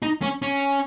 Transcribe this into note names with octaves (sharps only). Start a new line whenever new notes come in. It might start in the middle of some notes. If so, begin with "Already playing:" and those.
D#4
C#4
C#4